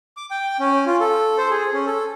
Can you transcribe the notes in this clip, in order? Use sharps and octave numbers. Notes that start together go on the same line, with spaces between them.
D6
G5
C#4
F4
A4
C5
G#4
C#4
A4